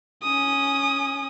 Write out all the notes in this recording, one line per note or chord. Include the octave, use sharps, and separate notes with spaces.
C#4 D#6